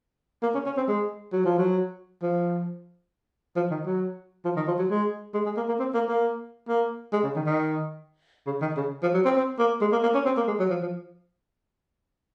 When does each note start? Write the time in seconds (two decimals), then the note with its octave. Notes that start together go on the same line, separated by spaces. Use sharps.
0.43 A#3
0.55 C#4
0.66 C#4
0.77 C4
0.88 G#3
1.32 F#3
1.45 F3
1.59 F#3
2.22 F3
3.56 F3
3.71 D#3
3.86 F#3
4.45 F3
4.56 D#3
4.68 F3
4.79 F#3
4.90 G#3
5.34 G#3
5.46 G#3
5.57 A#3
5.68 A#3
5.80 C4
5.94 A#3
6.09 A#3
6.68 A#3
7.13 G#3
7.24 C#3
7.36 D#3
7.46 D#3
8.46 C#3
8.61 D#3
8.77 C#3
9.03 F3
9.14 F#3
9.25 C4
9.36 C4
9.59 A#3
9.81 G#3
9.92 A#3
10.03 A#3
10.14 C#4
10.26 C4
10.37 A#3
10.47 G#3
10.59 F#3
10.70 F3
10.82 F3